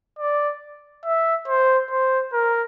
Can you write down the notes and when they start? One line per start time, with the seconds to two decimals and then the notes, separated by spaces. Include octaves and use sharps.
0.19 D5
1.05 E5
1.48 C5
1.90 C5
2.33 A#4